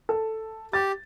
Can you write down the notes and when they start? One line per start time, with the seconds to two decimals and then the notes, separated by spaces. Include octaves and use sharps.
0.09 A4
0.73 G4 A6